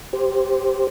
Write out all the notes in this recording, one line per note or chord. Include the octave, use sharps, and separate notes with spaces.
G4 C5